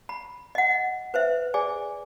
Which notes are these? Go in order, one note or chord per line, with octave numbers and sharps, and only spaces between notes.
B5
D#5 F#5
B4 C5 E5
G#4 D5 G#5